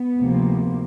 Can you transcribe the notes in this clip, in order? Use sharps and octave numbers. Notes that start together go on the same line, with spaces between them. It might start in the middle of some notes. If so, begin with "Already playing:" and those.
Already playing: B3
D2 C3 F3 A#3